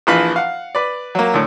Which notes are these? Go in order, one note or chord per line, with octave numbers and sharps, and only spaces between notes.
A#1 E3 F3 B4 F5
F5 F#5
B4 D5
F#3 A#3
D2 A2